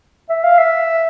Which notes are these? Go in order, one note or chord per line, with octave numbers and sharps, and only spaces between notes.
E5
F5
E5